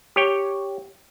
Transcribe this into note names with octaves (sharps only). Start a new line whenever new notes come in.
G4 C#5 G5